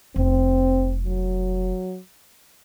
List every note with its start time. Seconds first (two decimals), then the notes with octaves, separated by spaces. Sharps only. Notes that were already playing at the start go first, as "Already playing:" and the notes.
0.16 F1 C4
1.04 F#3